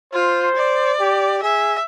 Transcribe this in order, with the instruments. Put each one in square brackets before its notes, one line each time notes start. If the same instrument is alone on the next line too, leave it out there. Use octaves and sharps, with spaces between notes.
[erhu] F4 [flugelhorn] C5
[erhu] D5
[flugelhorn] G4
[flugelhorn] G#4 [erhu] E5